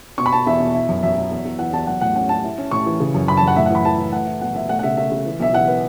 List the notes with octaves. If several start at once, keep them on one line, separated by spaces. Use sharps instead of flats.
B2 C#6
B5
B2 A5
E2 E5
B2
E4
F#2
F#2 E5
F#3
E2
E2
E3 F#5
E2 A5
F#3 F#5
A2 F#5
C#4 F#5
C#4 A5
E4
C#4
A2 C#6
E3
C#3
F#2
F#2 B5
A5
F#2 F#5
A2 E5
F#5
E3 B5
E3 A5
E3
A3 F#5
E4
B1 F#5
B2 E5
A3 F#5
F#5
C#3 E5
A3 E5
C#3
E3
B1 E5
E3 F#5
B3